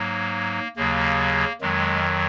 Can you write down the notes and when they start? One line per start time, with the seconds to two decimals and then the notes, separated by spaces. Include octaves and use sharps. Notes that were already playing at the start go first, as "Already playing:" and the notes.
Already playing: G#2 F#3 A#3
0.76 D#2 C#3 F#3 A#3
1.61 F2 D#3 F#3 G#3